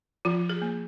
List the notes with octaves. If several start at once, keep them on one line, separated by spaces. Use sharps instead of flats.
F3 F4
G#4
A#3